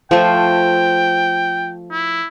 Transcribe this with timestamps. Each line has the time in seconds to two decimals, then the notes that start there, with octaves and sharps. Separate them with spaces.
0.11 F3 A3 F4 G5
1.92 E4